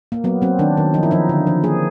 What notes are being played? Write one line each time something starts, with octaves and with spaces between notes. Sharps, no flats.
A#3
F#3 B3
F#3 C4
D#3 D4
D#3
F3 D#4
E4
F3 D#4
D3
F3
A#3 G#4